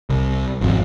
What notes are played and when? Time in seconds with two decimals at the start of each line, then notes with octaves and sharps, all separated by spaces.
0.10 C2
0.61 G#1 F2